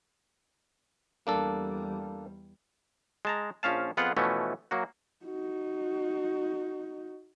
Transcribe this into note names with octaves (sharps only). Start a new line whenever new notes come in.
E2 G3 A#3 D4 A4
G#3 A5 A#5
A#1 F3 C#4 F5 A5
F2 B3 F4 G#4 F#5
B2 E3 F3 A3 C#4
F#3 A#3 F#4
D#4 F#4